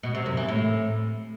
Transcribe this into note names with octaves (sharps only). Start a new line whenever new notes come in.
B2
C3
F#2
E3
A2